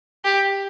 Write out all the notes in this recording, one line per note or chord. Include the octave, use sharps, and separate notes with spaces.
G4